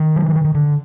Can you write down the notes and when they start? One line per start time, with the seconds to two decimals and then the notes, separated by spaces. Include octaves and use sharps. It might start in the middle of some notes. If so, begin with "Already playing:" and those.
Already playing: D#3
0.16 F#3
0.26 F3
0.35 E3
0.44 D#3
0.54 D3